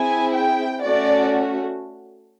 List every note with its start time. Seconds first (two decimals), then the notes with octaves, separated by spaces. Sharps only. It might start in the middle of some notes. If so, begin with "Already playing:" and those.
Already playing: C4 E4 G#4 G#5
0.34 G5
0.82 A3 C#4 F#4 D5